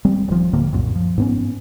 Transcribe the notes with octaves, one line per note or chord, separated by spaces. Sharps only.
G3 G#3 C4
D#1 F3
D#1 A2 D3 A#3
C2 F#2 A#2
F3
G#2 B3 C#4